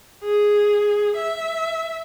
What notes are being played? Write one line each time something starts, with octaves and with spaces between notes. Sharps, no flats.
G#4
E5